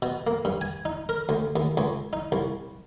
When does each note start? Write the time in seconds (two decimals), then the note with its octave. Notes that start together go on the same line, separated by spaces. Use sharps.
0.02 B2
0.27 A#3
0.45 G2
0.61 G#5
0.85 D#4
1.09 A#4
1.29 D2
1.56 D#2
1.77 C#2
2.13 D#4
2.32 C2